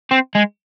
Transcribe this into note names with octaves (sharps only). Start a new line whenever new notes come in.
C4
G#3